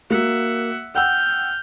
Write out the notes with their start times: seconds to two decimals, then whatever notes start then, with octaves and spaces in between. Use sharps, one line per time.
0.10 A#3 F#4 E5 F#5
0.95 F#5 G5 E6 F6 G6